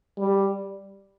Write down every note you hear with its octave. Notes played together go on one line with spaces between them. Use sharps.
G3